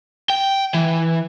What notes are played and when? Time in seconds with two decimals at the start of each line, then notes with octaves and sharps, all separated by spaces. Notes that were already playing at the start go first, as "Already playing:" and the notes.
0.30 G5
0.74 E3